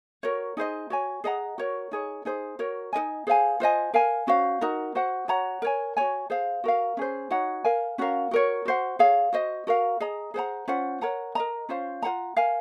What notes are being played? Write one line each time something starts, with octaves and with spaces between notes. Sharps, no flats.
F#4 A#4 C#5
D#4 G#4 C5 D#5
F#4 C#5 G#5
G#4 D#5 F#5 A#5
F#4 A#4 C#5
D#4 G#4 C#5
D#4 G#4 C5
F#4 A#4 C#5
D#4 A#4 D#5 G#5
G#4 C5 F5 G#5
F4 C5 D#5 G#5
A#4 F5 G#5
C#4 F#4 C5 F5
D#4 F#4 A#4
F#4 C5 F#5
F#4 C#5 F#5 A#5
A#4 C#5 G#5
F#4 C#5 G#5
G#4 C5 F5
F#4 A#4 F5
C#4 G#4 C5
D#4 F#4 C#5 F#5
A#4 F5 G#5
C#4 F#4 A#4 F5
F#4 A#4 C#5
F#4 C5 F#5
G#4 C#5 F5
F#4 C5 D#5
F#4 A#4 F5
G#4 D#5 A#5
G#4 C5 F#5 A#5
C#4 F4 C5 F#5
A#4 C#5 F#5 A#5
A#4 D#5 A#5
C#4 F4 C5 F5
F4 C5 F#5 A#5
A#4 F5 G#5